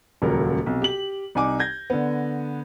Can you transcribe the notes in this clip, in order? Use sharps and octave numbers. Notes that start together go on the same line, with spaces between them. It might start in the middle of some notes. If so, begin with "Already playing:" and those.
D#1 C#2 F#3 A#4
B1 C3
G4 F#7
C2 D#4 G#5 D6
G6 G#6 A#6
D3 B3